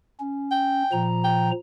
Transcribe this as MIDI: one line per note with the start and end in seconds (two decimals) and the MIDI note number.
0.20 0.83 61
0.51 1.05 79
0.92 1.51 46
0.92 1.51 53
0.92 1.51 82
1.24 1.50 79